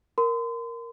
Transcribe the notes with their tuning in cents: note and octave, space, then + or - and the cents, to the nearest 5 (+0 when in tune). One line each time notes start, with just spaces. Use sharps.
A#4 +0 C6 -35